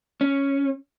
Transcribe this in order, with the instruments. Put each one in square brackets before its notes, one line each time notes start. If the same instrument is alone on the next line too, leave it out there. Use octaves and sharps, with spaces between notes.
[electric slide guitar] C#4